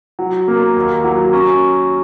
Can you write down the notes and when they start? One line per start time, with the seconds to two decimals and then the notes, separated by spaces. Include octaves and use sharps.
0.19 F#3
0.48 A#3
0.76 D#2
1.04 F#3
1.33 C#4